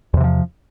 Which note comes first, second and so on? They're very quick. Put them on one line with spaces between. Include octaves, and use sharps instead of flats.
E2 C3 E3 F3